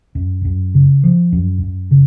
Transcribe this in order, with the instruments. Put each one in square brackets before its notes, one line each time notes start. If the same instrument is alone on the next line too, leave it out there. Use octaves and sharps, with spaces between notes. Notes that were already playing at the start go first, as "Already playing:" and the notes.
[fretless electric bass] F#2
F#2
C#3
F3
F#2
F#2
C#3